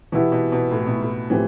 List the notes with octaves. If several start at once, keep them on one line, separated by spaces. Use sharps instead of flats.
B2 E3 B3 E4 G4
B2
B2
A2
B2
A2
A2 E3 F3 A3 C4 G4